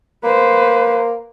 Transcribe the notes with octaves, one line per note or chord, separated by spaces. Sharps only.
A#3 B4 C5